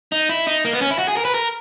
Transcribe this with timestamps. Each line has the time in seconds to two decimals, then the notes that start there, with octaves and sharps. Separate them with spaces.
0.12 D#4
0.29 E4
0.47 D#4
0.65 A#3
0.73 B3
0.81 C#4
0.91 E4
0.99 F#4
1.08 G#4
1.17 A#4
1.25 B4
1.34 A#4